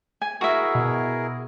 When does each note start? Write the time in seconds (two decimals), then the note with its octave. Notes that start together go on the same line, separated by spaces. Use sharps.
0.22 G#5
0.41 E4 F#4 G#4 A#4 E5
0.75 B2